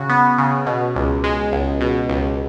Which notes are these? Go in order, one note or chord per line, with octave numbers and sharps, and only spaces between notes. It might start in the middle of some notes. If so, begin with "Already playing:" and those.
Already playing: C#3 F#4
B3
C#3
B2
C#2
G#3
C#2
B2
C#2